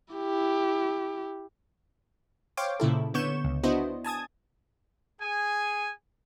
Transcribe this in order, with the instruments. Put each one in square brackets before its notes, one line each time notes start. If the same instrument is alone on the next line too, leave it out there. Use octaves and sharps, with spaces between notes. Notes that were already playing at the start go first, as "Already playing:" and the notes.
[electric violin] E4 G4
[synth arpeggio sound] C5 C#5 F5 G5 D6
A#2 C#3 E4 A4
D3 B3 C#5 C#6 G6 E7
C#2
B3 D4 E4 F#4 C5 D#5
G#5 A5 D#6 G#6
[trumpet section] G#4 G#5